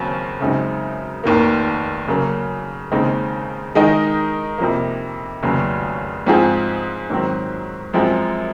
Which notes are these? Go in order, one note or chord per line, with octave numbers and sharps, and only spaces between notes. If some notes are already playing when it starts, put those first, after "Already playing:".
Already playing: D#2 C#3 F#3 C4
F#2 C#3 G#3 C4 D#4
F1 D#2 D#3 A#3
C#3 F#3 A#3
D#2 C#3 G#3 C4 D#4
D#3 G#3 D#4 A#4 D#5
F2 C3 F3 A#3
F1 D#2 C#3 F#3
G#2 F3 C4 F4 G#4
G#2 D#3 F#3 C4
F#2 F3 G#3 C4